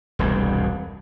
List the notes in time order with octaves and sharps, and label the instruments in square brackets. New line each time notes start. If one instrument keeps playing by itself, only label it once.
[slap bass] E1 C2 G2